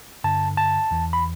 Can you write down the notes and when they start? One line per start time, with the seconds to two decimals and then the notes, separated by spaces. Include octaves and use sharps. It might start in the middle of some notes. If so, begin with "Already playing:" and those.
0.24 G2 D3 A5
0.57 A5
0.91 E2 E3
1.13 B5